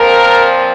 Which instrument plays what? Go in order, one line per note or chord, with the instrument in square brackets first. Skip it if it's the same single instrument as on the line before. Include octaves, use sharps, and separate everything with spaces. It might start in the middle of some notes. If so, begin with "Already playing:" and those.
Already playing: [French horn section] A#2 F3 C4 A#4